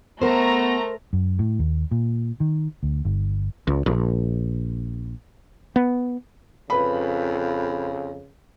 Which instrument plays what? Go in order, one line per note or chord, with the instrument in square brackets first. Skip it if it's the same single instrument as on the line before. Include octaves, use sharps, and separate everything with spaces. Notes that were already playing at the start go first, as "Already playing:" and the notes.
[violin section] A3 A#5 [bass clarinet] B3 [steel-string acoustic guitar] A#4 C5
[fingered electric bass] F#2
A2
D#2
A#2
D#3
D2
G1
[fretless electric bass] C#2
A#1
B3
[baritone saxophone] F2 [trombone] C#3 [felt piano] B4 B5